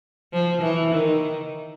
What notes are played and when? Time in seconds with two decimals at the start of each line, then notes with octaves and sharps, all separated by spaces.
0.33 F3
0.62 E3
0.91 D#3